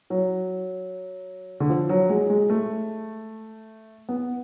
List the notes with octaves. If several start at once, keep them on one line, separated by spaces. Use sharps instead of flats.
F#3
D3
F3
F#3
G#3
G#3
A3
B3